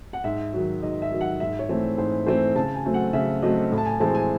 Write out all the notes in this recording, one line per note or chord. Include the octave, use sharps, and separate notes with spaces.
F#5
G#2 E5
D#3 F#3
G#2 D#5
E5
D#3 F#3
F#5
G#2 E5
C#5
E3 A3 C4
G#2 C5
E3 A3 C4 C5
C#3 A5
G#5
F#3 A3 C4
F#5
C#3 E5
F#3 A3 C4 D#5
A2
A5
G#5
E3 G#3 C4 A5
G#5